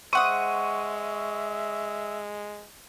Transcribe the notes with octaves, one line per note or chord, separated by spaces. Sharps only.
G#3 C5 E5 F#5 C#6 D#6 D#7